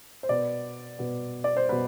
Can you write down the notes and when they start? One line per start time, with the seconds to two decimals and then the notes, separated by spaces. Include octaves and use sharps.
0.23 C5
0.29 B2 B3 D5
0.99 B2 B3
1.44 D5
1.57 C5
1.69 B2 B3 B4